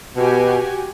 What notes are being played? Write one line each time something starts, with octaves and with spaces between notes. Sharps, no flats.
B2 F#4 G4 G#5